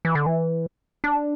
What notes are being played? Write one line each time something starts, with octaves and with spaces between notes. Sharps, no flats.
E3
D3
E3
D4